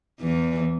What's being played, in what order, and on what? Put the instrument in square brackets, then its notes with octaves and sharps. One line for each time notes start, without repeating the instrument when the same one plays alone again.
[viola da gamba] E2 E3